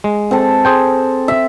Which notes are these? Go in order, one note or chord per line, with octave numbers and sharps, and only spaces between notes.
G#3
C4 A4
G#4 C5 G5
E5